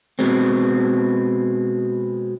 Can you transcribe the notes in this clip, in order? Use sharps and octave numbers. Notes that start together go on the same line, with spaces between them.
B2 G#3 C4